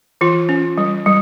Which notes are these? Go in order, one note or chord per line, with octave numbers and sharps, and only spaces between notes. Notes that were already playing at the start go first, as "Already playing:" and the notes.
E3 F4
C#4
G3
G3